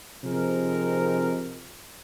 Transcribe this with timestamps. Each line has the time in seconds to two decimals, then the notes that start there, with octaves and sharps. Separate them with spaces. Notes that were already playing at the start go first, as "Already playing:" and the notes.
0.23 C3 F3 C4 D#4 G#4 A#4